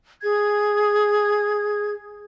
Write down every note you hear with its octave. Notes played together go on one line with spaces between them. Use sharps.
G#4 G#6